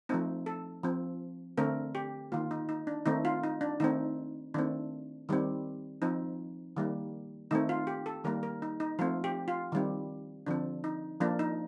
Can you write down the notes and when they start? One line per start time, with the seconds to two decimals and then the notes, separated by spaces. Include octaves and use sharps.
0.09 F3 A3 C4 D#4
0.46 A4
0.83 F3 C4
1.58 D3 A3 C4 A#4
1.95 G4
2.32 D#3 A#3 F4
2.51 D#4
2.69 D#4
2.87 D4
3.06 D#3 A3 C4 D#4
3.25 F4
3.44 D#4
3.61 D4
3.80 D#3 A3 C4 D#4
4.54 D#3 A3 C4 D4
5.29 D#3 G3 C4
6.02 F3 C4 D#4
6.77 D#3 G3 A#3
7.51 D#3 A3 C4 D#4
7.69 F4
7.87 G4
8.06 A4
8.24 D#3 G3 A#3 A#4
8.43 A#4
8.62 D#4
8.80 D#4
8.99 F3 A3 C4 F4
9.24 G4
9.48 F4
9.72 D#3 G3 C4
10.46 D3 F3 C4 D4
10.84 D#4
11.21 F3 A#3 D4
11.39 D#4